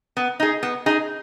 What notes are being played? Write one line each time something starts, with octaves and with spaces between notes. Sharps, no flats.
B3
D#4 G#4
B3
D#4 G#4